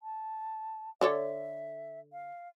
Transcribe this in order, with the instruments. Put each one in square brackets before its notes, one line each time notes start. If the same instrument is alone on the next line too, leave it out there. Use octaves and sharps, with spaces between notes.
[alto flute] A5
[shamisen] D3 A4 C#5 [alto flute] E5
[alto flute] F5